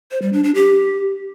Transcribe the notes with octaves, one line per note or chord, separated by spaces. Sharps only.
C5
G3
D4
D4
G4